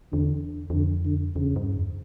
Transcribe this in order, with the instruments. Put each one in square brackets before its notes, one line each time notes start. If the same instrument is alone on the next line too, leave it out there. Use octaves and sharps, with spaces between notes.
[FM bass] E2 [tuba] D3
[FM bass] E2
[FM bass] F2 [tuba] D3
[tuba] D3
[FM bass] E2 [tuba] C#3
[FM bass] G2
E2